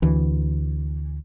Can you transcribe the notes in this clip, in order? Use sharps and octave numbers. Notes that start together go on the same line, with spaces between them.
D2 E3